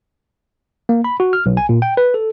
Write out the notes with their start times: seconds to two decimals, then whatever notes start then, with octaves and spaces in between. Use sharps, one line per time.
0.89 A#3
1.04 B5
1.20 F#4
1.33 F6
1.46 B1
1.57 G#5
1.69 A#2
1.82 G5
1.97 B4
2.14 A4